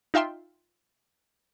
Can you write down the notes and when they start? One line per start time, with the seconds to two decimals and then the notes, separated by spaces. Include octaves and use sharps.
0.14 D#4 F4 E5 G5 C6